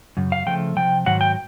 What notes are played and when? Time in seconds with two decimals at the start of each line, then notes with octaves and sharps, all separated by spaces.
0.17 F#2 C#3
0.32 F5
0.47 C#3 F3 A3 G5
0.76 C3 F3 G5
1.06 G#2 D#3 F#3 F#5
1.21 G5